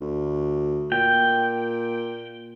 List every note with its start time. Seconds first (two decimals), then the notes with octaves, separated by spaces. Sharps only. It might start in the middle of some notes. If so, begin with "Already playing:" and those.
0.01 D2
0.92 A#2 G5